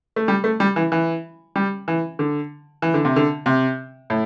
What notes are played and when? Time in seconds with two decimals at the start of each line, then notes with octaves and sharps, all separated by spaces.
0.16 A3
0.28 G3
0.44 A3
0.60 G3
0.76 E3
0.92 E3
1.56 G3
1.88 E3
2.19 D3
2.82 E3
2.94 D3
3.05 C3
3.16 D3
3.46 C3
4.10 A2